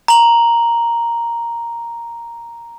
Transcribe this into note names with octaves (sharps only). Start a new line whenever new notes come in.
A#5 F#7